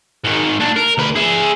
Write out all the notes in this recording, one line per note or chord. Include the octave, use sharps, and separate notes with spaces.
G#2 D#3
A#2 D4
A#4
D2 B4
G#4 E5